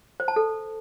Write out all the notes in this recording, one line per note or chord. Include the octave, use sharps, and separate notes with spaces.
C5
A5
A4